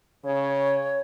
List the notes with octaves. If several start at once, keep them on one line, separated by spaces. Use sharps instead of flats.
C#3 C#5